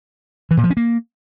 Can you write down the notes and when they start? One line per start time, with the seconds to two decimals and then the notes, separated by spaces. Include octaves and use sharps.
0.51 E3
0.57 A#2
0.64 F3
0.70 C#4
0.77 A#3